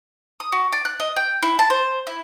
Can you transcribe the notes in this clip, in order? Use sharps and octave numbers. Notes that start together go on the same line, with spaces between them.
D#6
F#4
D5
F#6
D#5
G5
E4
A5
C5
E4